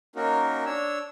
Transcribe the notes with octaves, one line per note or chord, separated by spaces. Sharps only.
A#3 C#4 D#4 F#4 A#4
D4 C#5 E6